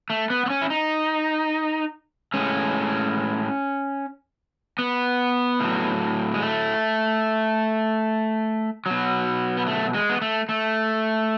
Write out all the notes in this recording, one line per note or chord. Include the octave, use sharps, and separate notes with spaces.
A3
B3
B3
C#4
E4
D#4
A2 G#3 C#4
B3
A2 F#3
G#3
A3
B2 F#3
B3
A3
G#3
B3
A3
A3